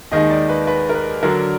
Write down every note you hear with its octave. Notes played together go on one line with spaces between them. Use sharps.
D#2 D#3 G#3 D#4 D#5
D5
B4
B4
A#4
B4
D3 F#3 D4 A#4